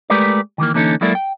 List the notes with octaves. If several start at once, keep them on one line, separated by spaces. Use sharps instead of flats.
G#3 A3 G4 A#4 B4 D5
D#3 E3 A3 A#3
D3 E3 A#3 C#4 D#4 A4
F#3 G#3 A#3 E4 A4 D5
G5